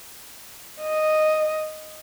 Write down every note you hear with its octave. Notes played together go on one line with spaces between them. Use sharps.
D#5